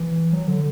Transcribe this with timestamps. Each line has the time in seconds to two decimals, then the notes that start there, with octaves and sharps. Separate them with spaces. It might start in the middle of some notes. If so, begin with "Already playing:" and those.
Already playing: E3
0.32 F#3
0.48 D3